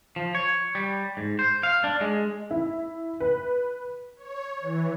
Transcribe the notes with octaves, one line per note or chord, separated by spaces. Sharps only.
F3
C#5
G3
G#2
C5
F5
D4
G#3
E4
B4
C#5
E3